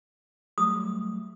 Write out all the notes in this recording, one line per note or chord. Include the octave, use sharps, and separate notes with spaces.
F#3 G3 A3 D#6